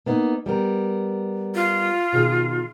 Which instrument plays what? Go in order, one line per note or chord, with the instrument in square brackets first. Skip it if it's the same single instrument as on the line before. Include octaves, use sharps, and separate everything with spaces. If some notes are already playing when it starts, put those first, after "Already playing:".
[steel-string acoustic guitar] A#3 B3 D#4
G3 B3 A#4
[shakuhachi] F4
[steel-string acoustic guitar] B2 D#3 G#4